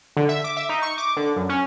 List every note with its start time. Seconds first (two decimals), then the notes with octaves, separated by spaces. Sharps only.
0.17 D3
0.29 E5
0.44 D6
0.57 E5
0.69 D#4
0.82 C#6
0.98 D6
1.17 D3
1.36 F#2
1.49 C#4